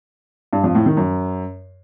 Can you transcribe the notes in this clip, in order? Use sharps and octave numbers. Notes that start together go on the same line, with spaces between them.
G2
F2
A2
D#3
F#2